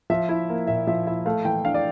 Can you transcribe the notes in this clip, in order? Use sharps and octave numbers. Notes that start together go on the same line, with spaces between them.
F3 E5
E4
A#3
A#2 E5
F3 E5
E4 E5
A3 F5
E3 G5
D4 F5
D5